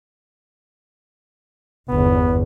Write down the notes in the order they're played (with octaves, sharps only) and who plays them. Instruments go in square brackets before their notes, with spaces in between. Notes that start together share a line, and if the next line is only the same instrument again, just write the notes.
[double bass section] G1 E2 [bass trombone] B3